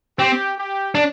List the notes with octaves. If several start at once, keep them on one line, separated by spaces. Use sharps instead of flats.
C4 G4
G4
D4